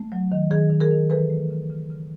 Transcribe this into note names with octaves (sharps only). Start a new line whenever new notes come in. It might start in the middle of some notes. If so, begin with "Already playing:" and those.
Already playing: A3
F#3
D#3
D#3 G#4
D#3
G#4 A#4
D#3
E3 A4 B4
A3
C#3
C#3
C#3